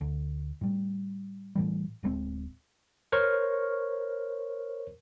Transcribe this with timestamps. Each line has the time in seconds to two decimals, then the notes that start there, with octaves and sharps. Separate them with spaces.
0.01 D2
0.61 A2 G3
1.55 A2 E3 G3
2.03 D1 G2 G#3 C4
3.12 A#4 C5 C#5 C#6 F6